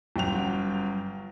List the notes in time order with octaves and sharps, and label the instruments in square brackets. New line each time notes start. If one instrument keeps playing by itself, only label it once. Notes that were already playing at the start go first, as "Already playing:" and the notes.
[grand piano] G1 F#2 G5 F7